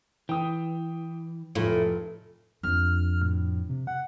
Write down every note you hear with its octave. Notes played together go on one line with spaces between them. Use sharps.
E3 G5 D#6
F1 A2 F4
F2 D4 F6
A2
C3
F#5